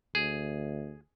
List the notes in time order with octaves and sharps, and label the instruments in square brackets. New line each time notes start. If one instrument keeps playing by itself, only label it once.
[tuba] D2 [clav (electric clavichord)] G#4